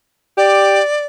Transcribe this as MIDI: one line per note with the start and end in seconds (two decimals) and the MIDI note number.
0.38 0.81 67
0.38 1.06 74